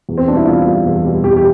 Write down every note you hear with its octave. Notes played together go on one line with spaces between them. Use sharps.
E2
C4
B2 D4
G3 E4
E2 F4
B2 G3
E2
B2 G3
E2 G4
G4